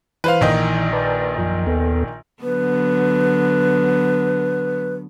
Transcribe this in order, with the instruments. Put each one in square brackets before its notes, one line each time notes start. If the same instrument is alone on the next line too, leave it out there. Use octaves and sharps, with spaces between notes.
[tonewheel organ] E3 [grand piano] B4 C5 F5
[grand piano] A#1 D#3 D#5
[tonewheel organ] B4 D5 A5
F#2 F3
D#2 B3 A4
[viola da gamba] D3 F#3 B3 [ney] B4